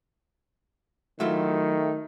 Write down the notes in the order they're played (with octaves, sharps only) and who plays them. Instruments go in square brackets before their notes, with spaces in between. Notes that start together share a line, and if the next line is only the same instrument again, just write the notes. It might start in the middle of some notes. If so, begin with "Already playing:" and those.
[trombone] D#3 [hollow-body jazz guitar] F#3 E4 F4 [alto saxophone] A3